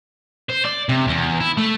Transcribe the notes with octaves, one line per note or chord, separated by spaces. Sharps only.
C5
D5
C3
E2
E4
A3